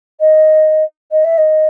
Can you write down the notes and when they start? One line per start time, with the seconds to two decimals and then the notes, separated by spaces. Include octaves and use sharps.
0.20 D#5
1.11 D#5
1.24 E5
1.38 D#5